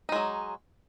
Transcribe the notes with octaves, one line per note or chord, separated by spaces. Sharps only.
F#3 G#3 D#4